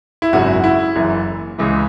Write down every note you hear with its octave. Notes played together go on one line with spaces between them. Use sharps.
E4
G#1 F#2 C#3 F#4
E4
F#1 F#2 E3
C#2 C#3 E3